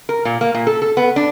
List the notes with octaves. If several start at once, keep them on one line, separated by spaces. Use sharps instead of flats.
A#4
A#2
A#3
A#2
A4
A4
B3
D4